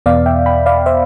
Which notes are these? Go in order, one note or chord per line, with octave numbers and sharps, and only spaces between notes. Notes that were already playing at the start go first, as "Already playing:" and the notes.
E2 B2 B3 D5 F5
E5 G5
G5 B5
D5 F5
C5 E5